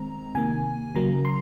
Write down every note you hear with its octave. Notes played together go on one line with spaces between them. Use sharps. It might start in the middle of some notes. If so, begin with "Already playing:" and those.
Already playing: D#3 G#3 C4 A#5
C3 D#3 A#3 G#5
C#3 F#3 A#3 A#5
C6